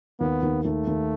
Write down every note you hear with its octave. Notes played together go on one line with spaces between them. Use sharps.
D#2 B3
D#2
D#2 A3
D#2